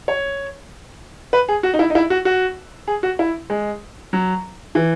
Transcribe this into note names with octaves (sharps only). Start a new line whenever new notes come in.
C#5
B4
G#4
F#4
D#4
E4
D#4
E4
F#4
F#4
G#4
F#4
E4
G#3
F#3
E3